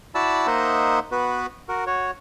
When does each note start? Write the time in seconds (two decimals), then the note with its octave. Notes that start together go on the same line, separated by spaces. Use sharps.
0.15 E4 F#4 D5 A5 B5 E6
0.47 A#3 D#4 C5 D#5 E5 F#5
1.12 B3 F#4 B4
1.69 F#4 A#4
1.87 F#4 C#5